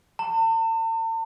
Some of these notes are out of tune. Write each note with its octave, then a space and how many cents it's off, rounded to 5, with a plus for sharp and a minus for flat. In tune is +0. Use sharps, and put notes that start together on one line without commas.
A5 +45